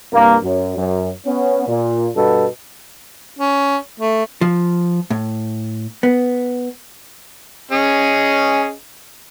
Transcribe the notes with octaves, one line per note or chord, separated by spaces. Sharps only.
C2 G2 A#3
F#2
F#2
B3 C#4
A#2
G2 B2 B3 A4
C#4
A3
F3
A2
B3
C#4 G#4 D#5